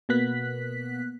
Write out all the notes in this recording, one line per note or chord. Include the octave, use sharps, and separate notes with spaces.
B2 A#3 B3 F#6 B6